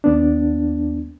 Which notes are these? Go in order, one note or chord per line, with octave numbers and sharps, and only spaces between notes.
D#2 B3 D4